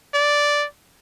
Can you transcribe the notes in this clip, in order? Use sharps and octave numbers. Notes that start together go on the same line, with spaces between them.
D5